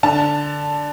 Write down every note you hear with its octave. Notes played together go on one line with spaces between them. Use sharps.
D3 A5